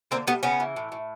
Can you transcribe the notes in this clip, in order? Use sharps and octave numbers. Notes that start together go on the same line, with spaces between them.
D3 A#3 C4
G3 A3 B3
C#3 B3 C#4
E3
A2
A2